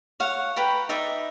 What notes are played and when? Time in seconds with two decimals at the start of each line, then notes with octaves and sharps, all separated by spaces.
0.20 C#5 F5 F#5
0.56 B4 G5 A#5 B5
0.89 D#4 D5 E5